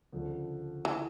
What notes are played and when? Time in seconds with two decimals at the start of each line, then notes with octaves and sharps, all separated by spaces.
0.13 D2 C#3 F3 A3
0.85 E3